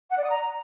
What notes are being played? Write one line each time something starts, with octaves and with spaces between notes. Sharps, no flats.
F#5
D5
D#6
A#5